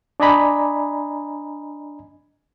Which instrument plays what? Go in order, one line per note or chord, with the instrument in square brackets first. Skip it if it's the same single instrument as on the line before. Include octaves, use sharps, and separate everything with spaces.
[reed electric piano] D4 D5 D#5 G#5 A#5 B5